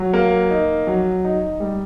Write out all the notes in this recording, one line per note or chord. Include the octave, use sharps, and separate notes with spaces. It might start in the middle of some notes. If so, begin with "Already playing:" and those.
Already playing: F#3
A#3
D#4
F#3
D#4
G3